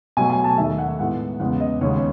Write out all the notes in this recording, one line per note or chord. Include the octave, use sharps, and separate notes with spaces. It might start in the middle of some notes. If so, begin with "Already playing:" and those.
B2 F#3 A3 G#5
G#5
A5
D#2 D#3 A3 E5
F#5
A2 G#3 B3 F#5
E2 C#3 G#3 B3 F#5
D#5
D#2 C#3 G#3 B3 C#5